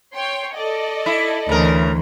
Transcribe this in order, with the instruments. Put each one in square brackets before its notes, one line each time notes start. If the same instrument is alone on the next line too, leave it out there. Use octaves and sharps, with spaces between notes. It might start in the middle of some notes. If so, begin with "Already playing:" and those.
[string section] C#5 G5 C6
A4 D5 D#5
[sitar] E4
[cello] D2 E3 [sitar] C#3 A#4